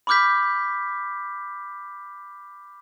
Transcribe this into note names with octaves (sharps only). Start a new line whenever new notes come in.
B5 C#6 D6 F6 G6 B6